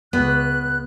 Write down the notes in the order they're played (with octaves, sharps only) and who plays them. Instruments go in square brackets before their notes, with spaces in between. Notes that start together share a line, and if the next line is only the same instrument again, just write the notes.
[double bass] C#2 [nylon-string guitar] B3 [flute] F#6